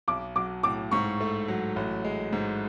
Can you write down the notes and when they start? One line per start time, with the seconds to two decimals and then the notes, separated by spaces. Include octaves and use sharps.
0.08 B1 D6
0.36 F#3 D6
0.63 A2 D6
0.91 G#2 C#6
1.21 A3
1.48 F#3
1.76 A1
2.05 G#3
2.33 G#2